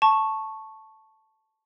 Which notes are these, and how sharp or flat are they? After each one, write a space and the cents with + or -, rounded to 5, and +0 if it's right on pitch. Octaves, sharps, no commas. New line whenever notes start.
A5 +0 C#6 -10